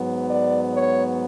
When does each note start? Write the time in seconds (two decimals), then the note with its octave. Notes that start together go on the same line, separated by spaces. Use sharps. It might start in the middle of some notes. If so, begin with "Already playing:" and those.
Already playing: G#2 F#3 B3
0.29 D5
0.72 C#5